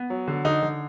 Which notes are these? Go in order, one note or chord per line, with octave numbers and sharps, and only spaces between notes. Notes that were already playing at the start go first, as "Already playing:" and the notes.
Already playing: B3
F#3
D3
D3 D#4
D3